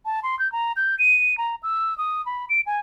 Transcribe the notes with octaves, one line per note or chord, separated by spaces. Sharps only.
A5
C6
G6
A#5
G6
D#7
A#5
E6
D#6
B5
D7
G#5